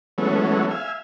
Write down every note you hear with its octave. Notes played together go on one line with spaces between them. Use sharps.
E3 F#3 G#3 A3 B3 C#4
E5 F5 G#5